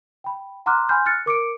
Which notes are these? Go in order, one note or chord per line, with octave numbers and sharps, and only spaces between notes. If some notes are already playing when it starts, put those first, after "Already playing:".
G5 B5
F#5 A#5 C6 D6 F6 F#6
G#5 B5 C6 F6 G6
F6 F#6 A6 C#7
A#4 D6 C#7 D7